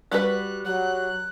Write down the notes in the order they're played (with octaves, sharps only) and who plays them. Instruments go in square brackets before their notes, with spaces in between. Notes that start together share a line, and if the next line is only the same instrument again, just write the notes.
[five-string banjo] G3 F#4 B4 [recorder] F#6
[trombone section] F#3 [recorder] F#6